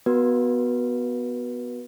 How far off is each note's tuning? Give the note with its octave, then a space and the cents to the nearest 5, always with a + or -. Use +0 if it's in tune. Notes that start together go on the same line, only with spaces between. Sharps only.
B3 +0 F#4 +0 B4 -30